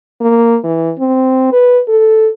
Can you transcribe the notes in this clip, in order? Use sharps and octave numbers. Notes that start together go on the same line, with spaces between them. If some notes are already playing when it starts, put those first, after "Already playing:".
A#3
E3
C4
B4
A4